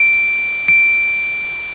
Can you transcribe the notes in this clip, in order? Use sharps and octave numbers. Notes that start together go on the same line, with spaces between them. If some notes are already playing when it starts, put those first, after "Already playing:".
Already playing: D7
D7